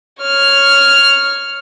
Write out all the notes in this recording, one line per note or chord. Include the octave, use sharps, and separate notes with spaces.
C#5 F6